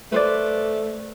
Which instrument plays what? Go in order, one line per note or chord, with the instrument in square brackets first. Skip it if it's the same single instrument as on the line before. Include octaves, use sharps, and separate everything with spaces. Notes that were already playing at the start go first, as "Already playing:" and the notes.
[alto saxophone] A3 [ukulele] B4 C5 D5